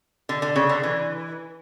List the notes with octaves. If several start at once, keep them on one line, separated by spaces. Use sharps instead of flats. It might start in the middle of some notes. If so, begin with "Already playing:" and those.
D3
D3
C#3
D3
E3